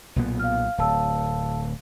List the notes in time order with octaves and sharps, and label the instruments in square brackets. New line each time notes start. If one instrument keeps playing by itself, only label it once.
[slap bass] B1 A#2 B3
[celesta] F5 F6
[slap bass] D1 [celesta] F5 A5 E6